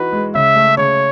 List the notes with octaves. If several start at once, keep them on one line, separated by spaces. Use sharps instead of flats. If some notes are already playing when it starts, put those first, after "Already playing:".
Already playing: E3 D#4 F#4 B4
G#3
C#3 E5
A3
C#3 C#5